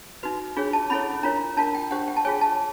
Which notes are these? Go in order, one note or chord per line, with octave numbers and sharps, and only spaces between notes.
D#4 F#4 B4
D4 F4 G#4 C#5
A5
C#4 E4 A4 C#5 B5
D4 F4 A#4 C#5 A#5
D4 F4 A#4 A5
G5
D4 G4 C5 F#5
G5
A5
F4 G#4 C#5 G#5
A5